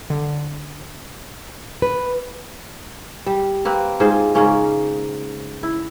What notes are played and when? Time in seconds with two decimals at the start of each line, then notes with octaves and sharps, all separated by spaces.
0.10 D3
1.82 B4
3.26 G3
3.65 A#3 C4 B4
4.00 G#2 F4 G#4 C5
4.35 G#2 C#3 A#3 C#4
5.63 E4